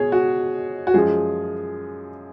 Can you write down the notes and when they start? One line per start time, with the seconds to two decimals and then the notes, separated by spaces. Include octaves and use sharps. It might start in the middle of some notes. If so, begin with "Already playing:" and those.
Already playing: B2 G#3 G#4 C#5
0.12 F#4
0.87 F#4
0.94 F#2 F3 G#3 G#4